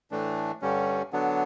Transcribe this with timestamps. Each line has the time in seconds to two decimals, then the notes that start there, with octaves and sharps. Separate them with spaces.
0.11 A2 E3 A3 D4
0.62 G2 D3 G3 C#4
1.13 D3 F#3 B3 D4